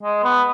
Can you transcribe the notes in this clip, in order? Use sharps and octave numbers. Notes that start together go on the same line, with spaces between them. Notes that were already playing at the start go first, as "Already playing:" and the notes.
G#3
B3